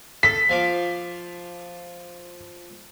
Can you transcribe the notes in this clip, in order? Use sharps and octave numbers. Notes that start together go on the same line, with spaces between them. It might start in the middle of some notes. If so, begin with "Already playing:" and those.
A4 B6
F3 F5 D6